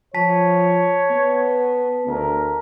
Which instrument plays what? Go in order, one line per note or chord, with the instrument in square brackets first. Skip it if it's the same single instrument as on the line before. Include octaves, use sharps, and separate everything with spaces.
[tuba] F3 [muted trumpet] C#5 [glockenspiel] A5 B6
[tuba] B3
[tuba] D2 [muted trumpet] A#4